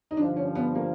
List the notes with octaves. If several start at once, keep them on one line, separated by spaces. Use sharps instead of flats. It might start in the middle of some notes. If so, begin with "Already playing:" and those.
D#4
G2 D3 F3 D4
C#4
B3
A#3